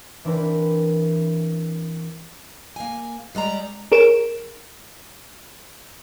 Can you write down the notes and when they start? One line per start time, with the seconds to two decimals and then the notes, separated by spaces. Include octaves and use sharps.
0.25 E3 C4 D4 E4 A#4 B4
2.76 A#3 G#5
3.35 G3 G#3 D5 A#5
3.92 G#4 A#4 C#5 D7 E7